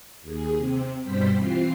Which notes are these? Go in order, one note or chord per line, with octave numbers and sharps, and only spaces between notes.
D#2 G#4
C3 C4
G2 B2 G3 C5 B6
E3 C4 F4 C7